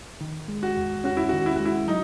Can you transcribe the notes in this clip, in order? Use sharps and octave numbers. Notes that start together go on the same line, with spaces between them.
D#3
G#3
F#4
E2
C#4 F#4
E4
D#3 F#4
E4
G#3 F#4
E4
F#3 D#4